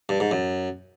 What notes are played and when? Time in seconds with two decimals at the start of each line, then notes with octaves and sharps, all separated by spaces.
0.09 G2
0.20 G#2
0.31 F#2